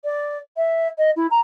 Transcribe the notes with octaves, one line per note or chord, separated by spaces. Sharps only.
D5
E5
D#5
E4
A#5